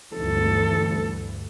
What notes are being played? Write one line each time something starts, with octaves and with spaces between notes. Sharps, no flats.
D2 G2 E3 A4